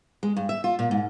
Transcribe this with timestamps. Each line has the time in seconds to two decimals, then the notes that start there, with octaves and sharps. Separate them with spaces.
0.23 G#3
0.37 G2
0.49 E5
0.64 F4
0.79 A#2
0.91 G#2